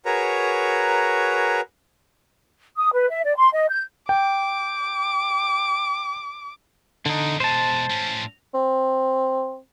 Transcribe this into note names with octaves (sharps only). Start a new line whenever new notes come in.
F#4 G#4 A#4 B4 C#5 A#5
D#6
B4
E5
D5
C6
D#5
G6
G5 D6
E2 D3 D4 D#4
B2 G#3 C5 A5
A2 C#4
C4